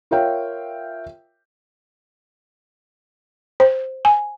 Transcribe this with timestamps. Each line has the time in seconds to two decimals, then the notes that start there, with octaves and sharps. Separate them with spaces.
0.11 F4 A#4 C#5 E5 F5 G5
3.60 C5
4.05 G#5